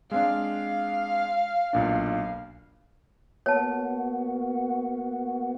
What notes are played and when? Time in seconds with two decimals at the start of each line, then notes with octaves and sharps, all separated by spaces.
0.11 G#3 C4 D4 F5
1.73 B1 A#2 D4
3.46 A#3 B3 F#4 C#5 A5